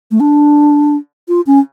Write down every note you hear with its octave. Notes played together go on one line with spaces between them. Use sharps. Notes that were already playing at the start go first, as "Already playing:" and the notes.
A3
D4
F4
C#4